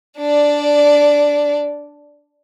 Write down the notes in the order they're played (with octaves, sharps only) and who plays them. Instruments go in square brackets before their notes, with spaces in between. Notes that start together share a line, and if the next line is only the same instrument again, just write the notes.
[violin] D4 D5